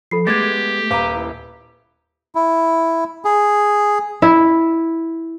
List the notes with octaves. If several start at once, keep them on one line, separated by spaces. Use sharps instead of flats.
F3 A4 B5 C7
G#3 A3 B3 G4 D6 G#6 A6
D#1 B4 F5 A#5 D6
E4
E4
G#4
E4